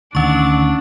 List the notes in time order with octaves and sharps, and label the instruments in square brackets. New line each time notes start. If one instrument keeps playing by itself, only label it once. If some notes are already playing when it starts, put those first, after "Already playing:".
[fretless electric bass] D2 D#3 [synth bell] C#4 C#6 [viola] D4